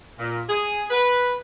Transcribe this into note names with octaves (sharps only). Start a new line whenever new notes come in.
A#2
G#4
B4